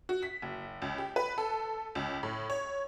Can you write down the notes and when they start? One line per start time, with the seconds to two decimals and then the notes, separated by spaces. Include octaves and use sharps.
0.09 F#4
0.23 B6
0.42 F#1
0.82 C#2
0.98 G4
1.16 B4
1.38 A4
1.95 C#2
2.23 A2
2.50 C#5